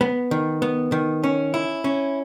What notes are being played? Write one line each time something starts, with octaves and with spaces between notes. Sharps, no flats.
B3
D#3
B3
D#3
C#4
E4
C#4